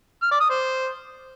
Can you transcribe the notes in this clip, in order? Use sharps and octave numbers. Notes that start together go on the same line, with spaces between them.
F6
D5
D#6
C5